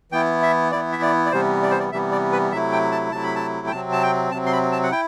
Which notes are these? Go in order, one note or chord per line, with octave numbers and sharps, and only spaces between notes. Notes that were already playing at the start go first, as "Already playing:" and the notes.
E3 B3 E4 G5
E5
E3 B3 E4 D5
E5
D5
D5
C3 E3 G3 B3 C5
D5
C5
D5
C3 E3 G3 B3 E5
D5
B4
C3 F#3 A3 E4 E5
G5
A5
C3 F#3 A3 E4 A5
B5
A5
G5
C3 F#3 C4 A5
A5
G5
C3 F#3 C4 A5
C6
B5
A5
F#5
E4 G5